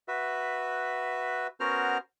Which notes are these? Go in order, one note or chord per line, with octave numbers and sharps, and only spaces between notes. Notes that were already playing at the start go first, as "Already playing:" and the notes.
F#4 B4 E5
B3 C#4 F#4 A#4 C5 F6